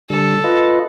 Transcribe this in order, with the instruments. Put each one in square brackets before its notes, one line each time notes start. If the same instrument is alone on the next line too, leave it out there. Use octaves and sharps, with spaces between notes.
[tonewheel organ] D3 G3 [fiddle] A4
[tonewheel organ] F4 B4 D#5